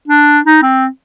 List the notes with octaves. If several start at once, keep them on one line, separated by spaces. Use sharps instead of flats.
D4
D#4
C4